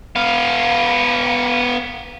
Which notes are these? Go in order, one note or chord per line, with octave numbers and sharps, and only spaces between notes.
B3 F5